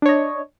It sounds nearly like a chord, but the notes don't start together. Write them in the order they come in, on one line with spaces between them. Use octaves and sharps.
D4 C#5 D#5